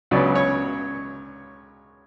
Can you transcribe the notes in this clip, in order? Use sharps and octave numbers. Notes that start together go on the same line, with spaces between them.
C#2 C#3 F#3 B3 D5
C#5